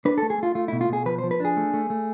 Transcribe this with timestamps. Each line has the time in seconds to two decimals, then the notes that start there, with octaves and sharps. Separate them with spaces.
0.05 D4 B4
0.18 A3 A4
0.30 G#4
0.38 A3 F4
0.55 A3 F4
0.68 B2 E4
0.81 F4
0.89 B2 G#4
1.06 F3 B4
1.18 F3 C5
1.31 B4
1.40 D4 G#4
1.57 A3
1.74 A3
1.90 A3